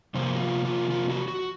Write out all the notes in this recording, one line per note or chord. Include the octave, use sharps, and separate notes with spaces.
C3 F3 A#3 C5
F#4
F4
F4
F4
F#4
F#4